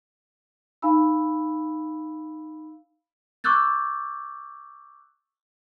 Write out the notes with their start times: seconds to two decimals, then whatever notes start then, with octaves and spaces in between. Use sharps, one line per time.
0.82 D#4 F5 G#5 B5 E6
3.44 C#6 D6 E6 F#6 G6 A6